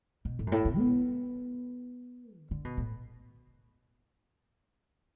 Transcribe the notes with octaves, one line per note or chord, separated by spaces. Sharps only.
B2
A2
F#2
A2
B2
B3
D3
D3
B2
A2